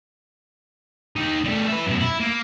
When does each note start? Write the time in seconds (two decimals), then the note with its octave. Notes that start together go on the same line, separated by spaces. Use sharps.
1.16 D#4 G4
1.45 G3 A3
1.69 B4 E5
1.86 F#2 B2
2.01 E4
2.21 A#3